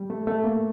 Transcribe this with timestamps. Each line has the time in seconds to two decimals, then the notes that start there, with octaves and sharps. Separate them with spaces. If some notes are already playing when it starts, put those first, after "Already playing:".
Already playing: G3
0.10 A3
0.27 A3
0.44 A#3